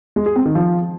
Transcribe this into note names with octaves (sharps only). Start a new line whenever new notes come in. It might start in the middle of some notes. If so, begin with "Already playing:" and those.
G#3
G#4
C4
D#3
F3